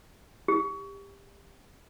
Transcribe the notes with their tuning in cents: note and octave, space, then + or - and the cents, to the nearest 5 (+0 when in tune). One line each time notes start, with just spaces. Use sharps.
G4 +20